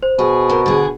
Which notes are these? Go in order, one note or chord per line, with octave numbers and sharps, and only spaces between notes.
C5
B2 G#4
F2 A#4
D3 G#4